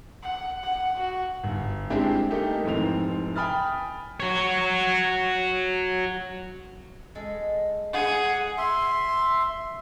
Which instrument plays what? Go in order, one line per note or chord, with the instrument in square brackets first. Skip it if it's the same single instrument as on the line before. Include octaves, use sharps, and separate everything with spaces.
[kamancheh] F#5
F#5
F#4
[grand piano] G1
G3 G#3 C4 D4 E4 G4
A3 A#3 D#4 G4
F1 G#2 E3 C4 F7
G5 G#5 B5 D#6 F6 A6
[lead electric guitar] F#4 C#5
[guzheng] G#3 A4
[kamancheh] G#4 [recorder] F#5
[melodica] E5 C6